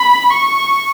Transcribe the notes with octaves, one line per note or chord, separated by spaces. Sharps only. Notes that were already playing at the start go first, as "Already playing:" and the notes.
Already playing: B5
C#6